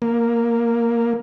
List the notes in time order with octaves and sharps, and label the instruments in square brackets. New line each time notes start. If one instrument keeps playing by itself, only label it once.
[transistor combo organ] A#3